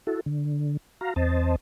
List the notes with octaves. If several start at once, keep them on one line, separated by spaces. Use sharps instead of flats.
E4 F#4 A4
D3
F#4 F5 A#5
E2 C4 C5 D#5 A5